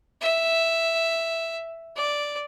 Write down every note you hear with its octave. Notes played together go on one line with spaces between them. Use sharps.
E5
D5